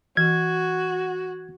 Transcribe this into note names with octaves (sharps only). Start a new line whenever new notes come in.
E3 F#4 G#6